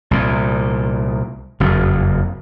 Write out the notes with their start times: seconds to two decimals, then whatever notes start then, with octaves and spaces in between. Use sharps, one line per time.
0.11 C2 A#2
1.60 F#1 F2